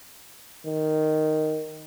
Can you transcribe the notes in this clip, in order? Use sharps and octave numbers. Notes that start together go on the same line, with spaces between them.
D#3